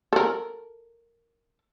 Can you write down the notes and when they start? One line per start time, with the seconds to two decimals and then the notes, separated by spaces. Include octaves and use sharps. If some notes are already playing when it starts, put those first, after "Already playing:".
0.13 A4 A#4